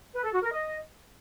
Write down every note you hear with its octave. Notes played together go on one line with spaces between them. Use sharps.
B4
A4
F#4
A#4
D#5